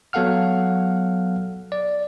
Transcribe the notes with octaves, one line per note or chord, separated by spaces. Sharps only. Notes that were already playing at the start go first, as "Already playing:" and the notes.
F#3 B3 A4 F5 F#5 F6
D5